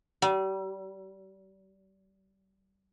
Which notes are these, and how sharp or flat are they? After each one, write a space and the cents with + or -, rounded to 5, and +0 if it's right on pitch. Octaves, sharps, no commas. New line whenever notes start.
G3 -35